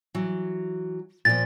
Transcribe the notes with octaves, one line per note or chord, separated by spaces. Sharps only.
E3 F#3
A#2 F3 A6